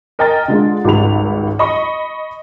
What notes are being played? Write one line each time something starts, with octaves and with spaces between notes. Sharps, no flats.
A#4 D#5 G5 G#5 A#5 A6
D3 G#3 F4
G#1 C#2 G3 B5 F7
D#5 B5 C#6